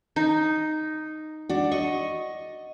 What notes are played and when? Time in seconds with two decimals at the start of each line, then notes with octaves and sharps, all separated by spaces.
0.16 D#4
1.49 D4 F#4
1.72 D#5 C#6